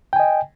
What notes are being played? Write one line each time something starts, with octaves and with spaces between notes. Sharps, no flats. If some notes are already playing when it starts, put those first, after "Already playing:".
D#5 G5 G#5